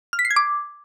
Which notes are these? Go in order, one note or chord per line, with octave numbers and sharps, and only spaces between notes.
F6
B6
C7
G#6
D6